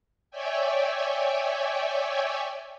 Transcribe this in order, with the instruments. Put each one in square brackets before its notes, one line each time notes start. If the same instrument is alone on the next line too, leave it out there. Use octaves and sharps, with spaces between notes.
[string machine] C#5 D5 E5 G5 G#5